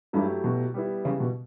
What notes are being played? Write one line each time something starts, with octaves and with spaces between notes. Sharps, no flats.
G2 F#3 A3 E4 G4
B2
G3 B3 E4
C#3
B2